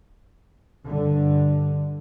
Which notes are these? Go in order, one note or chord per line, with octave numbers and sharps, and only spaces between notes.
G2 D3